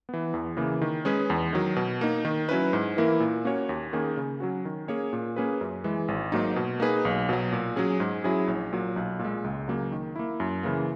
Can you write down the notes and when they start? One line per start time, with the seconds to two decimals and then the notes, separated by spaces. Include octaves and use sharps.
0.09 E3 B3
0.34 E2
0.57 C#3 E3 A#3
0.82 D#3
1.05 G#3 C#4 G#4 B4
1.30 E2
1.53 D#3 F#3
1.76 B2
2.01 A#3 D#4
2.25 D#3
2.49 F#3 C#4 E4 B4
2.73 G#2
2.97 E3 A#3 E4 A#4
3.20 A#2
3.45 A#3 C#4 F#4 C#5
3.69 D#2
3.93 D#3 A#3 C#4 G#4
4.17 C#3
4.40 F#3 C#4 F#4
4.65 D#3
4.88 A#3 C#4 G#4 C#5
5.13 A#2
5.36 A#3 C#4 G#4 B4
5.61 F#2
5.84 E3 G#3
6.08 G#1
6.32 G#2 F#3 A#3 D#4
6.56 B2
6.80 A#3 D#4 G#4 B4
7.05 B1
7.29 B2 F#3
7.52 A#2
7.76 F#3 C#4 G#4
8.00 G#2
8.24 F#3 C#4 E4 G#4
8.47 A#1
8.73 A#2 F#3
8.96 B1
9.19 A#2
9.25 G#3
9.44 C#2
9.68 C#3 F#3 A#3
9.92 D#3
10.16 A#3 E4
10.40 F#2
10.63 C#3 E3 A#3